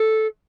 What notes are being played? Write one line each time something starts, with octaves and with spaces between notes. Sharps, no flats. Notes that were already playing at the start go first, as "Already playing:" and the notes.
Already playing: A4